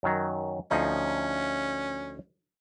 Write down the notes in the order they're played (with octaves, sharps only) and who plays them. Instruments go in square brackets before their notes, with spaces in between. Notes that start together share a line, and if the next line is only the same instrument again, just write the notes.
[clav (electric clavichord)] F#2 D#3 F#3
[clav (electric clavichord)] D2 F3 D#4 [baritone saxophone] C#4